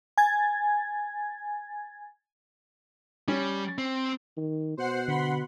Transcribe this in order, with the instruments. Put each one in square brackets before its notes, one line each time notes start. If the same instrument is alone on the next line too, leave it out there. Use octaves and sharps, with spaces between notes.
[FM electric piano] G#5 G#6 A6
[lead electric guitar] G3 [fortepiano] C#4
[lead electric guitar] C4
[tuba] D#3
[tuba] B2 [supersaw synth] C5 F#5 C7
[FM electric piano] D3 [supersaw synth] F#5 B5 C6